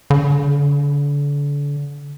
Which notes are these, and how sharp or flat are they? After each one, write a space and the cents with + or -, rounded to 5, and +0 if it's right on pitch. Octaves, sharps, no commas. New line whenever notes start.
D3 -35